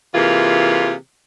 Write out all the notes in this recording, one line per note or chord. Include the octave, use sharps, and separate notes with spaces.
C3 E3 A#3 F4 G#4